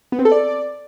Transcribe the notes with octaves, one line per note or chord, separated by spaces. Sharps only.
B3
C4
A4
D5